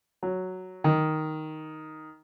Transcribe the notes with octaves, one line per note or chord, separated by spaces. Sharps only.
F#3
D#3